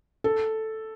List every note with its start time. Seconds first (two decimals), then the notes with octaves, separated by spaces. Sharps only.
0.24 A4